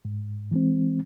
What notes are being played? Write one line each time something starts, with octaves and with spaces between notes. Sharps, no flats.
G#2
E3 G#3 C4